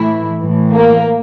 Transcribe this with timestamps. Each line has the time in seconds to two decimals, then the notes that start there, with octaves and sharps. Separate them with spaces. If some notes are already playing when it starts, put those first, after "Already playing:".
Already playing: A2 E3 E4
0.41 A2 E3
0.73 A#3